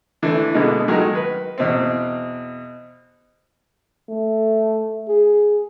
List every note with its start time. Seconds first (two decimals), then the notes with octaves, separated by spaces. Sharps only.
0.22 D3 E3 A3 D4
0.54 B2 D3 G#3 A#3 B3
0.88 D#3 F#3 G#3 A3 A#4
1.15 B4
1.58 E2 B2 C4
4.09 A3
5.08 G#4